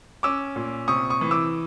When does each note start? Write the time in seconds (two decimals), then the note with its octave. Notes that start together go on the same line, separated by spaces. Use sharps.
0.23 C#4 D6 E6
0.56 A#2
0.88 C3 C#6 D#6
1.10 C#6 D#6
1.21 E3
1.31 D6 E6